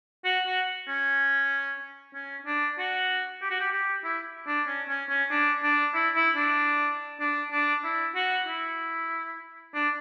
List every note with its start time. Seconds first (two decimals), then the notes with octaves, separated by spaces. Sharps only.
0.24 F#4
0.46 F#4
0.88 C#4
2.14 C#4
2.46 D4
2.78 F#4
3.42 G4
3.50 F#4
3.60 G4
3.72 G4
4.04 E4
4.47 D4
4.67 C#4
4.88 C#4
5.10 C#4
5.30 D4
5.63 D4
5.94 E4
6.15 E4
6.36 D4
7.20 D4
7.52 D4
7.84 E4
8.15 F#4
8.47 E4
9.74 D4